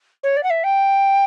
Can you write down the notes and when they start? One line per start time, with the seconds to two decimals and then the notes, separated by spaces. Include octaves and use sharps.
0.23 C#5
0.36 D5
0.43 F#5
0.50 E5
0.63 G5